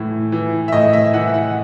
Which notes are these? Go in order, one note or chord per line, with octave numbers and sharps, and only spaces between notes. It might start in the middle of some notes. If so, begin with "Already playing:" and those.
Already playing: A2 E3
E3
E5
A2 D#5
E5
E3 F#5
F#5